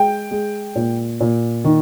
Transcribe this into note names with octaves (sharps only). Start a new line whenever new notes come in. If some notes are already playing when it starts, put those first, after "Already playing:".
Already playing: G#3 G5
G#3
A#2
A#2
D#3